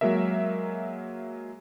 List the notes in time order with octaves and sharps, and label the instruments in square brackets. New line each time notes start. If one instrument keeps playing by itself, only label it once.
[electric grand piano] F#3 G#3 A#3 A#4 E5